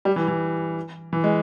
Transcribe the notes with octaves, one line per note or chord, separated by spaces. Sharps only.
G3
E3
E3
E3
G#3